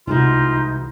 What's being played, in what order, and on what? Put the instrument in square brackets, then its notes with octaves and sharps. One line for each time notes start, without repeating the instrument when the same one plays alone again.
[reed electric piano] C2 [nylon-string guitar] E3 G#3 F#4 [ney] D#4 [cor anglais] F4